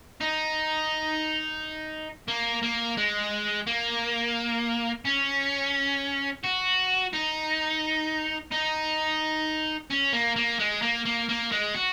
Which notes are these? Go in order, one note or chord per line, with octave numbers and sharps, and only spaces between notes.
D#4
A#3
A#3
G#3
A#3
C#4
F#4
D#4
D#4
C#4
A#3
A#3
G#3
A#3
A#3
A#3
G#3
F#4